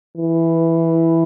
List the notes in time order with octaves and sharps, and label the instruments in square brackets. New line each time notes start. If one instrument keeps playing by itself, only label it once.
[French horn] E3